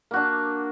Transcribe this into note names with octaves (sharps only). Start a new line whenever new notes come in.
A#3 D4 F#4